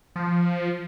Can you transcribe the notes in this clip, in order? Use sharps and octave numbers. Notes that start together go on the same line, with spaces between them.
F3